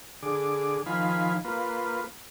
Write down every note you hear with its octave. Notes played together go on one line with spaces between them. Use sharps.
D3 G#4 D6
D#3 F3 F5 G#5 B5
A#3 F4 B4